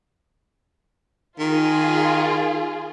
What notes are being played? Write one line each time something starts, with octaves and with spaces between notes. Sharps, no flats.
D#3 F4 G#4